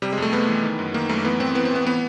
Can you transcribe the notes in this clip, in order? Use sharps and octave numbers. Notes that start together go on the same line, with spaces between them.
C3 G3
G#3
F2 A3
F2 B3
E3
D#3
F#2
D#3 A#3
F#2 A3
E3 B3
A2 C4
E3 B3
C4
A2 B3
E3 B3